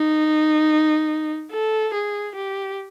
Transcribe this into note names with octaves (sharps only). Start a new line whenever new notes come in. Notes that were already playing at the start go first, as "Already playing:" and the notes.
Already playing: D#4
A4
G#4
G4